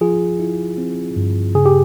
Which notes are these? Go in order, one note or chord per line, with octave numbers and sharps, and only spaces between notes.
F3 F4 G#4
E4
C4
G2
C#3 G#4
G4